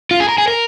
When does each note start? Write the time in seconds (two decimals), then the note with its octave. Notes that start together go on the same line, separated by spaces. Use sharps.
0.11 F4
0.20 G#4
0.29 A#4
0.38 G#4
0.48 A#4